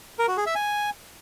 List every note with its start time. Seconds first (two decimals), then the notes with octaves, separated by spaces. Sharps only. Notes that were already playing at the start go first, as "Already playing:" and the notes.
0.19 A#4
0.28 F#4
0.37 G#4
0.46 E5
0.55 G#5